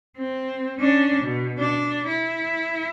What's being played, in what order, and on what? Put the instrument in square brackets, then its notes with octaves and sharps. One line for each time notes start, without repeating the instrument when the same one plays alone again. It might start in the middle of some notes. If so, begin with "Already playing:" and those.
[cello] C4
C#4 D4
B2
D4
E4